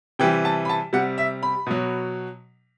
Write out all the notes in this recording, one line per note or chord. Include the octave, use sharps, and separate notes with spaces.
C3 E3 G3 G5
A5
B5
A5
C3 G3 F#5
E5
B5
B2 F#3